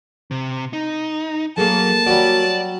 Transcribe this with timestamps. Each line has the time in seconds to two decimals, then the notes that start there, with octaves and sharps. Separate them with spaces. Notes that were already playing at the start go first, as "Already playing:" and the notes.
0.31 C3
0.73 D#4
1.58 F#3 A#3 G#4 A4 A5
2.06 F#3 G3 D5